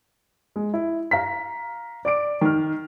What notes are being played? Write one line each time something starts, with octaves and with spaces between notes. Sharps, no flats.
G#3
E4
F5 A#5 B6
D5 D6 D7
D#3 F6